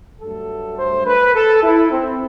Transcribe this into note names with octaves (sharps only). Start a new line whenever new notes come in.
G2 F#3 A3 A4
C5
B4
A4
E4
C4